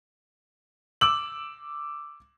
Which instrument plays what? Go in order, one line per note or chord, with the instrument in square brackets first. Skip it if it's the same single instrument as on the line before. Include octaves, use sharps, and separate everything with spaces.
[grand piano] D6 E6 F#7